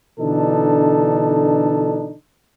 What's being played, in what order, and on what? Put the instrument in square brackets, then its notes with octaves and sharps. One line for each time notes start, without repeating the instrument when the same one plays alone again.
[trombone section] B2 D3 E3 D4 D#4 A4